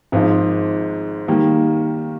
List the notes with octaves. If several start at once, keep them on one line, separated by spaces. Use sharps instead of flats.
G#1 G#2 F3
D#3 G3 A#3